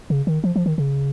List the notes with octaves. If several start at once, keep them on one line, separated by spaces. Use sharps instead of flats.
C#3
D#3
F3
F3
D#3
C#3